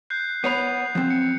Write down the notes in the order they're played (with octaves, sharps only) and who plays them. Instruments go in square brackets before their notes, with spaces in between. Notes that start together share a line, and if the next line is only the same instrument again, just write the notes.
[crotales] F#6 G6 C7
[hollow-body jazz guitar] B3 C#5 B5 [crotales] C7 F7
[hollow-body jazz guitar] F3 C4
[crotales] C#7